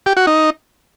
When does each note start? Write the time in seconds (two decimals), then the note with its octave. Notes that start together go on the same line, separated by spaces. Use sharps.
0.06 G4
0.17 F#4
0.27 D#4